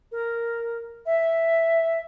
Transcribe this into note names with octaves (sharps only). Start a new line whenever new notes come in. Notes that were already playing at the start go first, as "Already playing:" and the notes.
A#4
E5